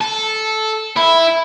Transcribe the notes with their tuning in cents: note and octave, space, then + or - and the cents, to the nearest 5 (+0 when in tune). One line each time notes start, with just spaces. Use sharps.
A4 -10
E4 +0